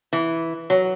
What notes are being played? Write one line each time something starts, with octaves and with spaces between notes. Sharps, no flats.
E3
F#3